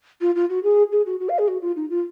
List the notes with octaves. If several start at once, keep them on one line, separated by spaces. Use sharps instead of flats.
F4
F4
F#4
G#4
G#4
F#4
F#4
F5
G#4
F#4
F4
D#4
F4